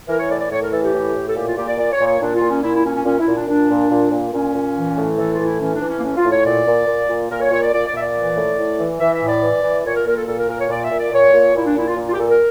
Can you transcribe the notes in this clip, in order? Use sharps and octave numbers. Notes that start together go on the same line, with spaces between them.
E3 A#4
C#5
A2 D5
D5
A2 C#5
A#4
E3 A4
G4
A2
A2
A4
A#2 G4
F4
A#2 G4
D5
A#2 D5
C#5
A#2
C#5
A#2 D4
F4
A#2
C#4
A#2 E4
E4
A#2 C#4
C#4
A#2 C#4
E4
A#2
D4
A#2 D4
A#2
A#2
A#2
A#2 C#4
A#2
E3
A2
E3 A4
F4
A2
E4
E3 C#4
D4
E3
C#4
A#3
A2 C#4
F4
A2
C#5
A#2 D5
A#2
A#2
A#2
A#2 A#4
C#5
A#2 C#5
D5
A#2 D5
D5
A#2 E5
D5
E3
A2
A2
E3
E3 E5
E5
A2
D5
E3
E3
A#2 C#5
A#4
A#2 A#4
A4
A#2 A4
A#4
A#2 A#4
C#5
A#2 D5
E5
A#2
D5
A#2 C#5
A#2
A#2 E4
D4
A#2 E4
F4
A#2
F4 G4
A#2 A4
A#4